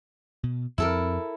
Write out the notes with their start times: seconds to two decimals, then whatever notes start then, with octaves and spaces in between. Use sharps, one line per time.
0.43 B2
0.78 F2 C4 E4 A4 A#4